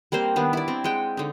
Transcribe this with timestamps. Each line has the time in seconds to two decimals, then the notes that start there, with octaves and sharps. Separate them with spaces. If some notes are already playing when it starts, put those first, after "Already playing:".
0.12 G3 A#3 C4 C5
0.36 D#3 B3 D4
0.53 E4 D5
0.68 C4
0.84 G#3 F#5 G5
1.17 D3 D#4